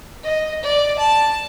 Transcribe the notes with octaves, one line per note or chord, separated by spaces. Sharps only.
D#5
D5
A5